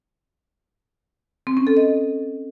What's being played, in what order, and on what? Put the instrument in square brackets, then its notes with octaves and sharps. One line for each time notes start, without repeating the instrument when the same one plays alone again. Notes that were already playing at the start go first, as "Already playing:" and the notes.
[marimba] C4
C#4
A4
D#5